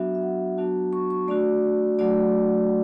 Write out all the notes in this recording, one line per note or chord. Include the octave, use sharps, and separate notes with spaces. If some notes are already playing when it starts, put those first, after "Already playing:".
Already playing: F#3 B3 D4 F#4 E5
E5
F#5
F#3 B3 D4 F#4 A5
C#6
C#6
A3 D4 F#4 D5
F#3 A3 D4 F#4 D5